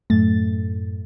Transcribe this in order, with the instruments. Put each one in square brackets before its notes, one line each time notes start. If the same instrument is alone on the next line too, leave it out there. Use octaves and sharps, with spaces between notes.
[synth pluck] F#2 A2 A3 A6